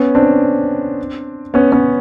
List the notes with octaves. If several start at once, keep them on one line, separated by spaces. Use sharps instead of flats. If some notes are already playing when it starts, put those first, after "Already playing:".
Already playing: B3 C#4
C4 D4
B3 C#4
B3 C#4